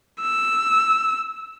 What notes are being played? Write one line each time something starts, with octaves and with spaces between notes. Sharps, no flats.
E6